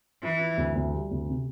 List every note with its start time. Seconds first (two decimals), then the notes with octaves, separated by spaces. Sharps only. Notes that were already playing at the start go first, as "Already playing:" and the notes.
0.23 E3 E4
0.40 E4
0.57 D2
0.75 D2
0.93 G3
1.11 D2
1.28 C3